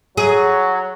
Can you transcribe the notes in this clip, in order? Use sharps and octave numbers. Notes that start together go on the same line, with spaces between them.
F#3 G#4